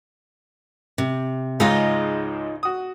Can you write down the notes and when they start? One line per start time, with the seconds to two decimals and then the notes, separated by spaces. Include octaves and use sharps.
0.98 C3
1.60 C#2 G#2 G#3 D#4 F4 D#5
2.63 F#4 D#6